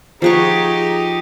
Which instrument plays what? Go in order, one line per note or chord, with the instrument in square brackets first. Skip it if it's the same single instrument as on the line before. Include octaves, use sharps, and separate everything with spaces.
[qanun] F3 F#5 C#6 [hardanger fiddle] D#4 G4 [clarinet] G#4